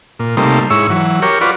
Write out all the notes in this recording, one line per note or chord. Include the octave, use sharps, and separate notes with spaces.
A#2
C3 G3 A3 A#3 D#4
G#2 E4 C#5 E6
E3 F#3
G4 A#4 C#5
F4 F#4 B4 D5